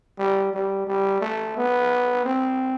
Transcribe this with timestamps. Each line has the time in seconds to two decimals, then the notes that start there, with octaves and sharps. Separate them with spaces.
0.18 G3
0.53 G3
0.87 G3
1.21 A3
1.57 B3
2.25 C4